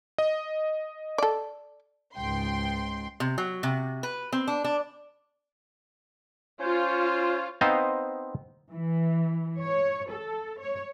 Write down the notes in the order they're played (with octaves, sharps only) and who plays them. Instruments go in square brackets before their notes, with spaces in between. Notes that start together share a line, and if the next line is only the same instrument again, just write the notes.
[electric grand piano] D#5
[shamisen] A4 D5
[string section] C#2 G#2 G5 C6
[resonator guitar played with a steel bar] C3
F#3
C3
B4
C4
D4
D4
[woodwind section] C#4 C5 [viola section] F4
[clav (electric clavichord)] B3 C4 D#4 C5 D#5 F5
[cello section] E3
C#5
A4
C#5